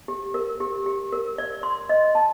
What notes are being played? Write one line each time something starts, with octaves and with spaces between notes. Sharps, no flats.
G4
A#4
G4
G4
A#4
D5
C6
D#5
A5